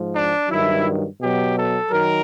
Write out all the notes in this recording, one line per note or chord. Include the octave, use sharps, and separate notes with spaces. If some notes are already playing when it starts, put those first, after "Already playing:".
Already playing: G#2 F3
D4
G2 D#3 F#3 E4
B2 F#3 G4
A4
D#3 F#3 A#4